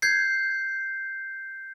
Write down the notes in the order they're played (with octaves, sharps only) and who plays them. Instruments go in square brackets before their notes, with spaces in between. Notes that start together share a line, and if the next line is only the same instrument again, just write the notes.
[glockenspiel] G6 G#6 C7